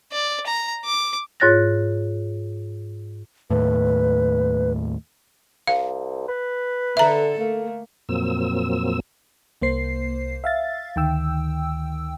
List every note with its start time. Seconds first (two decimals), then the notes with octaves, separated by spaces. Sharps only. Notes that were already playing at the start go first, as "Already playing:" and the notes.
0.12 D5
0.47 A#5
0.85 D6
1.40 G#2 F4 C#5 F#6 A6 A#6
3.50 D#2 A2 B4
5.67 C2 F5
6.28 B4
6.97 D3 A4 E5 A#5
7.40 A3 A#3
8.09 F2 A#2 F#3 A#3 C4 E6
9.62 C2 A#3 C5 C7
10.44 E5 F5 A6
10.96 D2 D#3 G5 E6